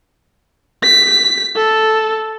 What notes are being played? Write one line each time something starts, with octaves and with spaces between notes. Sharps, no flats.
B6
A4